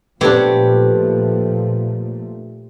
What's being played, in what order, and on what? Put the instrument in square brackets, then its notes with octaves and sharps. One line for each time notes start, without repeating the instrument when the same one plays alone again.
[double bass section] A#2 F3 A3 [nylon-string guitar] B3 D4 [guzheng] C4 G4 C#5